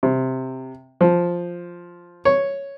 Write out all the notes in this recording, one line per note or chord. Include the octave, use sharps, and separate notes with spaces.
C3
F3
C#5